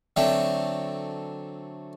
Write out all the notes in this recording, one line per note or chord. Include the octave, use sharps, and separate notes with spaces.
D3 F#3 A3 C4